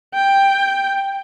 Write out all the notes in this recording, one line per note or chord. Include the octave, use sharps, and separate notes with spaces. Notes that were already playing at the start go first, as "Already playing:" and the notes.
G5